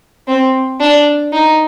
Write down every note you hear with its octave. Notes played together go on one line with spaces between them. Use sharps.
C4
D4
D#4